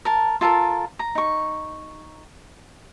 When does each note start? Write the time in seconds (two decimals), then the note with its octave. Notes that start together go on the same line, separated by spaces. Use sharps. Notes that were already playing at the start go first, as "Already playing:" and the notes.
0.05 A#4 A5
0.41 F4 A4 A#4 A5
0.99 A#5
1.15 D#4 C#6